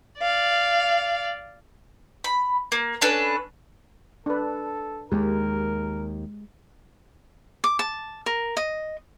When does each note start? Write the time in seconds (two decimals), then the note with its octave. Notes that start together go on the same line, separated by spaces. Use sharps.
0.19 D5 F5
2.24 B5
2.72 A#3
3.01 C#4 D4 A4 B4
4.26 D4 A4 B4
5.12 D#2 G#3 G4 A#4
7.64 D6
7.79 A5
8.26 A#4
8.57 D#5